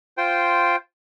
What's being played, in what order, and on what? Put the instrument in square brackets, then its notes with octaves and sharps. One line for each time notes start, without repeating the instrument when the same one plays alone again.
[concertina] F4 C5 G5